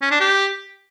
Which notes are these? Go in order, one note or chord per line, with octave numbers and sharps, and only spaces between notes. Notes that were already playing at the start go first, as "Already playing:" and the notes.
C#4
D4
G4